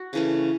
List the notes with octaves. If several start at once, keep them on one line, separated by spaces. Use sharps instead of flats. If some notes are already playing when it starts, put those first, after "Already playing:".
Already playing: F#4
C#3 E3 A3 C#4